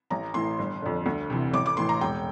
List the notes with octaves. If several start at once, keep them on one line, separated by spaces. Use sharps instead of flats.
A1 A#5
A2 E3 C6
G1
F2 D3
D2
C3 E3
A1 D6
D6
A2 E3 C6
A#5
E1 G5